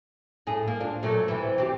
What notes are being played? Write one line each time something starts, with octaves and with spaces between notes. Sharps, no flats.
A2 G#4
A#3
D4 F4
A#2 F#3 A3
C3 E3
C4 F#4 G4